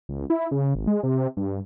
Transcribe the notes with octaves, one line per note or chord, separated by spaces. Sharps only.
C#2
E4
C#3
G#1
G#3
C3
G2